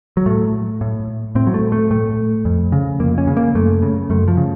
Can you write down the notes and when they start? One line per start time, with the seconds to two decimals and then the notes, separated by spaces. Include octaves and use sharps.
0.17 F#3
0.26 A2 A3
0.81 A2
1.35 A2 C4
1.47 F#3
1.54 A3
1.72 A3
1.91 A2 A3
2.45 F2
2.72 C#3
3.00 F2 A#3
3.18 C#4
3.27 C#3
3.37 A#3
3.55 F#2 A3
3.82 C#3
4.10 F#2 A3
4.28 F3
4.37 C#3